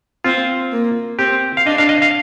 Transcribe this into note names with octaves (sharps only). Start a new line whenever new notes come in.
C4 F4
A#3
C4 G4
F5
D4 D#5
F5
D#5
F5